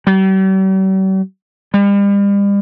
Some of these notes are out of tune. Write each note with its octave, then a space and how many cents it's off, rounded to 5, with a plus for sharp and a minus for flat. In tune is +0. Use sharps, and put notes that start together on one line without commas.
G3 -45
G3 +40